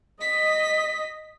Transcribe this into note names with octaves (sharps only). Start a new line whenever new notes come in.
D#5 B6